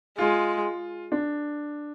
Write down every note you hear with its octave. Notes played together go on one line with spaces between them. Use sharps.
G#3 F4
D4